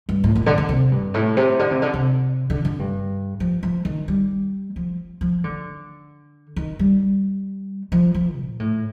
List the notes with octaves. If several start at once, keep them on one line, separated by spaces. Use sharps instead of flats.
G2
A2
A#2
D3
D3
C3
G2
A2
C3
D3
C3
D3
C3
D3
D3
G2
F3
F3
D#3
G3
F3
F3
D3
D#3
G3
F3
F3
A#2
A2